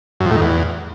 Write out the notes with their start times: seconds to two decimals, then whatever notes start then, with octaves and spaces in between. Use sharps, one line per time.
0.20 F#2
0.26 F2
0.31 A2
0.36 D#3
0.41 E2